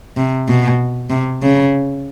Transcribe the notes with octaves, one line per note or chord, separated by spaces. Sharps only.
C3
B2
C3
C#3